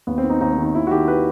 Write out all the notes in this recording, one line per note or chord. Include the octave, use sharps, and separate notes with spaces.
D#2 B3
C4
D#3
D#4
D#2 D#4
C4
D#3
D#4
D#2 E4
F#4
D#3 G4
B4